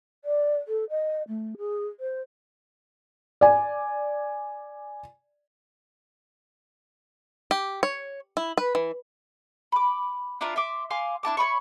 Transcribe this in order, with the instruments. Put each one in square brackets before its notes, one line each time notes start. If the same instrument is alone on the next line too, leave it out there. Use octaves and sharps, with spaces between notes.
[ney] D5
A4
D#5
A3
G#4
C5
[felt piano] D5 G#5
[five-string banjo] G4
C#5
E4
B4
E3
[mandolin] B5 D6
D4 E4 F4 A#4
E5 C6 D6
F5 G#5 C6 D6
D4 E4 A5 D6
C#5 D5 B5 C#6